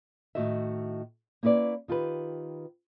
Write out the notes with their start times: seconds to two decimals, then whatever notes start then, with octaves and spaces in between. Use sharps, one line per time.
0.35 A2 D#3 A#3 F#4 D#5 E5
1.43 A#3 C#4 E4 B4 D5
1.88 D#3 F4 G4 B4